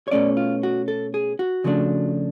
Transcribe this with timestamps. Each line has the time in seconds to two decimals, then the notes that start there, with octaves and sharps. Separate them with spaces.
0.08 C#5
0.11 B2 A3 C#4 D5
0.37 F4
0.63 F#4
0.88 A4
1.14 G#4
1.39 F#4
1.64 C#3 F3 A3 D4